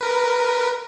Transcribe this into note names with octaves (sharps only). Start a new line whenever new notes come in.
A#4 B4